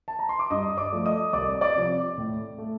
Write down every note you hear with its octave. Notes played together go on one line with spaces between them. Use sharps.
A5
A#5
C6
D6
G2 D#5 D#6
D5 D6
F3 A3
D#5 D#6
C2 D5 D6
D5 D6
C3 F3
A2
A3